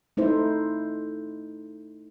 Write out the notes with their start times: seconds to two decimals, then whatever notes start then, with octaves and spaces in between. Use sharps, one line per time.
0.17 A3 D#4 E4 C5